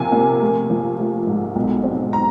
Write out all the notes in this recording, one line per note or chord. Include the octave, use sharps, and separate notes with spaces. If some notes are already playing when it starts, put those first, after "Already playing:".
Already playing: C3 F3 A#3 G#5
A#3
A3
F3
A3
G#2
B1
C4
A#5